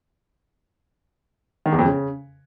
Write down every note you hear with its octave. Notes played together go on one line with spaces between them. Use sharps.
D#3
E2
F2
C#3